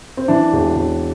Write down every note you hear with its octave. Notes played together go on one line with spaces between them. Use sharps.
C4
E3 D4
E1
E1